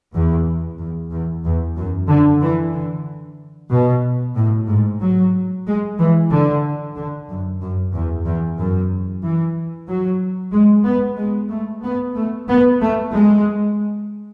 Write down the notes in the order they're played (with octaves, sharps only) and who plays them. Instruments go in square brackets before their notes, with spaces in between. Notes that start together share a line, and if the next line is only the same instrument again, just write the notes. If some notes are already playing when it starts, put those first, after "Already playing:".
[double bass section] E2
E2
E2
E2
F#2
D3
E3
D3
B2
A2
G#2
F#3
G#3
E3
D3
D3
F#2
F#2
E2
E2
F#2
E3
F#3
G#3
B3
G#3
A3
B3
A3
B3
A3
G#3